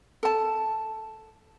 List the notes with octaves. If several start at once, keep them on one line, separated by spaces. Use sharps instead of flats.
A4 A5